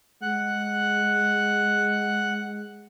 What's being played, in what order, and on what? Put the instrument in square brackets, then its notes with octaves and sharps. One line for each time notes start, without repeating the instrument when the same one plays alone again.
[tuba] G#3 [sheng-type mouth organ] F#5 F#6